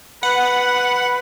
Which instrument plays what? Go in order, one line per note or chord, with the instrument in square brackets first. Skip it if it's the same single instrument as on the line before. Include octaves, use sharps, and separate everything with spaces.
[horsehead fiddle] B4 [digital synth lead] F#5